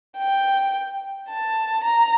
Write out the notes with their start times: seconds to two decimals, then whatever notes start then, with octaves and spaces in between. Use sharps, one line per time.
0.18 G5
1.29 A5
1.84 A#5